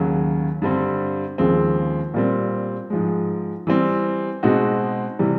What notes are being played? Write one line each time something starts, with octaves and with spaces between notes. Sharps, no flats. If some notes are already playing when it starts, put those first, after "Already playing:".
Already playing: D#2 C#3 F#3
G2 D3 G3 C4
D#2 C#3 F3 G#3 C4
A#2 G3 C4
G#2 F3 G#3
E3 G3 C4
B2 G#3 C4 D#4 F#4
C3 E3 G3